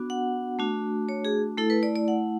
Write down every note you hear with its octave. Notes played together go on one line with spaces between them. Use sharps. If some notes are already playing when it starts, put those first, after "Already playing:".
Already playing: B3 D4 F#4
F#5
A3 D4 F#4
C#5
G#4
A3 E4 A4
B4
D5
D5
F#5